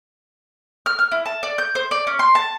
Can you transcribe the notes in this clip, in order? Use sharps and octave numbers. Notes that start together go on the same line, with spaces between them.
F6
F6
E4
A5
D5
G6
C5
D5
C#4
C6
A5